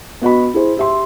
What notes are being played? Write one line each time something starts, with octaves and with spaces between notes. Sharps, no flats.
B3 F#4 D#5 B5
E4 G#4 C5
G4 E5 C6